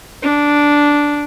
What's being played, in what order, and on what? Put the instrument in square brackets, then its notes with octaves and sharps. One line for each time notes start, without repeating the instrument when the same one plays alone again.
[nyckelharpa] D4